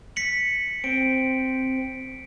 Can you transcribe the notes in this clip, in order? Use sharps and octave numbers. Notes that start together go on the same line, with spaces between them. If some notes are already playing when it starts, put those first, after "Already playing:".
B6 C#7 F#7
C4 D7